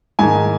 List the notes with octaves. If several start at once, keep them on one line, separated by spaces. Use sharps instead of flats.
G#2 D#3 G#5